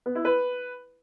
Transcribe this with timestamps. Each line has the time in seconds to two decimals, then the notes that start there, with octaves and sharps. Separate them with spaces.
0.06 B3
0.15 E4
0.25 B4